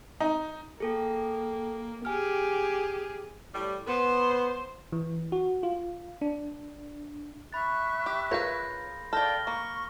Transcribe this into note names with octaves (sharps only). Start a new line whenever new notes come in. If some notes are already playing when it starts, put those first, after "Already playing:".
D#4
A#3 G#4 A4 G5
G4 G#4 G#5 F6
A2 G3
B3 C5
E3
F#4
F4
D4
E5 B5 C#6 F#6 A6
G4
F4 G#4 A#4 B4 C#5 G6 A#6
A4 D5 F5 G5 F6 G6 A#6 G7
A#3 C#6